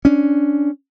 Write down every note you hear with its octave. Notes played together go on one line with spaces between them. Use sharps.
C#4 D4